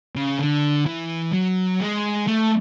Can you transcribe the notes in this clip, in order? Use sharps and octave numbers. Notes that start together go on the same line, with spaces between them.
C#3
D3
E3
F#3
G#3
A3